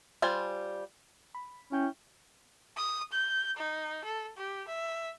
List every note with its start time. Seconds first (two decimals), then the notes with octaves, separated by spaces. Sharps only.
0.22 G3 F4 C5 G#5
1.35 B5
1.72 C#4 E4 G5 G6
2.77 D#6
3.12 G6
3.57 D#4
4.05 A4
4.37 G4
4.68 E5